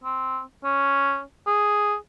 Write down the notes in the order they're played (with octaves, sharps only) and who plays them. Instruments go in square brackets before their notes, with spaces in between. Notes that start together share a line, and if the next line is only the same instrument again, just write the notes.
[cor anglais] C4
C#4
G#4